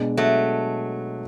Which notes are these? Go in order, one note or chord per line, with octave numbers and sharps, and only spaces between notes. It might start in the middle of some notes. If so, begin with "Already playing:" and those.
Already playing: B2 G#3 D4
F#3 A3